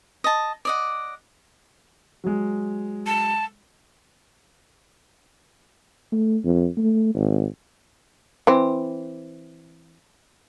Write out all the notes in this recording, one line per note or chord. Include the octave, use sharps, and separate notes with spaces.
D#5 A5
D5 D#5 F#5
F#3 G#3
A5
A3
F2
A3
G#1
E3 C4